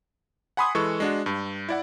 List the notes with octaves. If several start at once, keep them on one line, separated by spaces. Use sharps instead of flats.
F#5 G#5 B5 C6 D#6
E3 G#3 A4 C#6
G#3 D4 F#4
G2
E4 D5 F#5